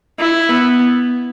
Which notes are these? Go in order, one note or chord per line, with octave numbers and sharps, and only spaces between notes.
E4
B3